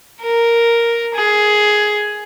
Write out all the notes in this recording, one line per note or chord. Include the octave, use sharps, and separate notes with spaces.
A#4
G#4